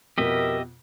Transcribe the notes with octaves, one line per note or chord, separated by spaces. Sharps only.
F2 B2 G4 A#4 D#5 E5